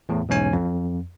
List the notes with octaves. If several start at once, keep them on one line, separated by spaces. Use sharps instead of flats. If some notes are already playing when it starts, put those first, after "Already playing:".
E2 A2
B1 E2 G#2 C#4 G#5
F2